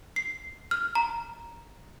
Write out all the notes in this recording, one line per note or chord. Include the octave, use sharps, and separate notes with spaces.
C7
F6
A#5